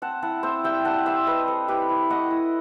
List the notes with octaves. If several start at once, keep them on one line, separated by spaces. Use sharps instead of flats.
C4 F#5 A5
E4 F#5 A5
C4 C5 E5
G3 E5 G5
G3 F#5 A5
G3 C5 E5
C4 B4 D#5
G3 A4 C5
E4 G4 B4
E4
A3 D#5 F#5
E4